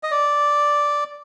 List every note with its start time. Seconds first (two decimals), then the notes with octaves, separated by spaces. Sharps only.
0.03 D#5
0.11 D5